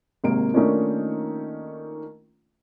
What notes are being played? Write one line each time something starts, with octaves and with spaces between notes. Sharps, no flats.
G#1 C3 A#3 A#4 D7
D#3 A3 A#3 C#4 D4 F4